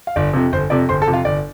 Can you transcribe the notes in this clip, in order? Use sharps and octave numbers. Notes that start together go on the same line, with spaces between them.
F5
G1 D5
F2 C3
G1 C5
F2 C3 D5
G1 C5 C6
A4 A5
F2 C3
F4 F5
G1 D5